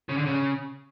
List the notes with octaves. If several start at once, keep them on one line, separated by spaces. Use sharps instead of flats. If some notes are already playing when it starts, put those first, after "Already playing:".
C#3
D3
C#3